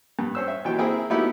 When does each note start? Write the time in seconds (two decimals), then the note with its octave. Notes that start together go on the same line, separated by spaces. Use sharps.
0.19 G2
0.35 C#4 C5 E6
0.48 E5
0.65 D#2 E3 F#3 G5
0.79 A#3 C4 E4 G#4
1.10 F#3 A3 B3 D#4 E4 G4